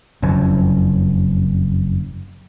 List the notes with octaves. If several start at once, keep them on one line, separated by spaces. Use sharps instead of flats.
F#1 F2